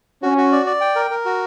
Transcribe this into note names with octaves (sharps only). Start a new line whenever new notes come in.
C#4 F#4
F#4
D5
D5
G5
A#4
A#4
F#4